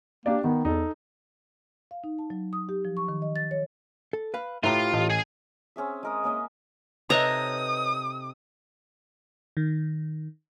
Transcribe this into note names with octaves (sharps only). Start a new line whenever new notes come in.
A#3 D4 G4 D5
D#3 B3
E2 D#4 A4
F5
D#4
A5
F#3
D#6
G4
F3
C#6
D#3
D#5
A6
C#5
A4
B4 F5
A2 F4 G4 B4 E5 A#5
A1 D#5
G#4 G#5
C4 C#4 G#4 E5
G#3 A#4 D#6
A#3 C#4 D#5 E5
C3 D#4 A4 B4 C#5 D#5 A#5 D#6
D#3